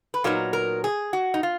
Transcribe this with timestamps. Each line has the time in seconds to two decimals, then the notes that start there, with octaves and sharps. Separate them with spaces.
0.14 B4
0.24 A#2 F#3 B3 D#4 A#4
0.53 A#4
0.84 G#4
1.13 F#4
1.34 D#4
1.43 F4